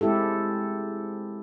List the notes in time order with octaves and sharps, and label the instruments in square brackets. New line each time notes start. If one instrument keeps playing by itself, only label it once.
[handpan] G#3 C4 E4 G4 A4